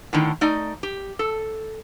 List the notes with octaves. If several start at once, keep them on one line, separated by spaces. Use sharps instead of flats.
A2 D3 D#3
A3 D#4 D5 D#5
G4
A4